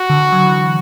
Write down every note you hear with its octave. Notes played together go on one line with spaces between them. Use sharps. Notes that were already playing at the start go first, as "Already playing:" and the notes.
Already playing: F#4
D3
F#3
E3